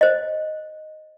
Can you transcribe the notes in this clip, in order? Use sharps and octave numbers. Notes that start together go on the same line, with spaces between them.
C5 D#5